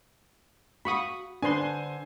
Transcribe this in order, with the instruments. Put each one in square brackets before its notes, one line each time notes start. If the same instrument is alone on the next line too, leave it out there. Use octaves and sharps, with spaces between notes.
[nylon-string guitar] F#4 F5 [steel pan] B5 C#6 D#6
[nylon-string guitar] D3 D5 [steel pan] D4 B4 C6 [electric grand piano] C5 G#5